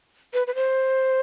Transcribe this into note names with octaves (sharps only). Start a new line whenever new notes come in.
B4
B4
C5